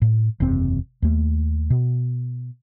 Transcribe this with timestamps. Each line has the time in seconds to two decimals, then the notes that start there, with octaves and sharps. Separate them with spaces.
0.02 A2
0.40 F#1 E2 C3 C4
1.02 D#2 A3
1.70 B2